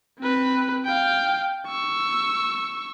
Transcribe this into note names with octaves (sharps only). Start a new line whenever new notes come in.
C4 B4
F5 G5
C#6 E6